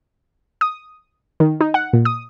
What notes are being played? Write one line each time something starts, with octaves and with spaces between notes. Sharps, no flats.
D#6
D#3
D#4
F#5
A#2
D#6